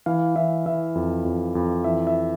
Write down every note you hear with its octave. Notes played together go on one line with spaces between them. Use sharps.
E3 F5
E3 E5
E3 E5
F2
F2
F2
E3 E5
E5